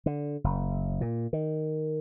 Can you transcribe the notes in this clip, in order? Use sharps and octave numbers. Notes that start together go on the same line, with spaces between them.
D3
F#1
A#2
D#3